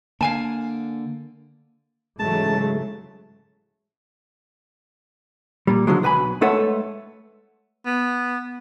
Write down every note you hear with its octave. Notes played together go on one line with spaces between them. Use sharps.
D3 A#3 F5 G#5 A5
G#2 C#3 E3 F#3 G#3 A3 A5
A#2 G3
D3 F3 F#3 G#3
B1 B4 G#5 B5
G#3 A3 A4 B4 C#5 F#5
B3